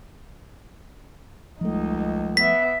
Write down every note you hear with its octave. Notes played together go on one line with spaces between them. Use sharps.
C#2 F3 G3 A3 D#4
B3 E5 B6